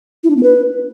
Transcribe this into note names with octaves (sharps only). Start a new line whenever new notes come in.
E4
D4
B3
B4